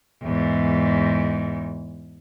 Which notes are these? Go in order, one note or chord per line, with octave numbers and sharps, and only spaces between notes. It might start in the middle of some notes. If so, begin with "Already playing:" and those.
E2 G#2